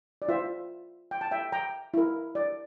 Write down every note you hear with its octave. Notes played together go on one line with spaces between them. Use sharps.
D5
F4 C5 E5
G5
A5
E5 G5
G5 A#5
E4 A#4
D5